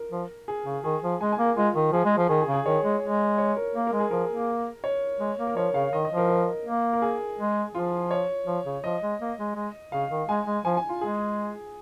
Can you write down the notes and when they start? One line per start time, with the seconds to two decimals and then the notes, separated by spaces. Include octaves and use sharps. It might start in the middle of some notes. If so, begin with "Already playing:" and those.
Already playing: A#4
0.11 F3
0.48 G#4
0.65 C#3
0.84 D#3 G#4
1.03 F3
1.21 G#3 G#5
1.32 G#5
1.39 A#3
1.45 A#4
1.57 G#3 F4
1.75 D#3
1.93 F3 G#4
2.05 G#3
2.18 F3
2.29 D#3 G#4
2.42 G#4
2.48 C#3
2.54 G#4
2.66 D#3 C#5
2.84 G#3
3.03 G#3
3.38 C#5
3.57 A#4
3.75 A#3
3.87 A#4
3.92 G#3
3.99 G#4
4.11 F3 A#4
4.30 A#3
4.84 C#5
5.19 G#3
5.39 A#3
5.47 A#4
5.56 F3 C#5
5.74 C#3 F5
5.93 D#3 D#5
6.05 D#5
6.11 F3
6.17 A#4
6.29 A#4
6.65 A#3
6.93 A#4
7.02 G#4
7.38 G#3
7.74 F3 F4
8.11 C#5
8.46 F3
8.65 C#3
8.84 F3 D#5
9.02 G#3
9.20 A#3
9.38 G#3
9.56 G#3
9.92 C#3 F5
10.11 D#3
10.28 G#3 G#5
10.46 G#3
10.65 F3 G#5
10.77 G#5
10.89 F4
11.01 G#3 G#4